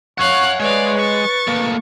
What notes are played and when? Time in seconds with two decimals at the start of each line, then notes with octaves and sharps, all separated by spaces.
0.18 C#5 F5 F#5 G#5 C#6 F#6
0.59 G#3 B4 C#5 D5 F5
0.96 C#6 A6
1.47 A2 A#3